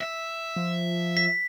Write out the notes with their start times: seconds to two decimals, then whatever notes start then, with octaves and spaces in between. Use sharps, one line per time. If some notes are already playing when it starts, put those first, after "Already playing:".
0.01 E5
0.56 F3
1.17 B6